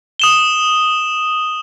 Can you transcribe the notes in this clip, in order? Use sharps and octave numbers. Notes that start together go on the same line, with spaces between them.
D#6 E7 G7